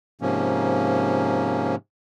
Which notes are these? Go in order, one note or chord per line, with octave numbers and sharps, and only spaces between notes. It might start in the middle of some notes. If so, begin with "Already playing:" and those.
G#2 C3 F3 A#3 C#4